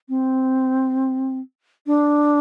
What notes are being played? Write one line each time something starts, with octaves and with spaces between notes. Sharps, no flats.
C4
D4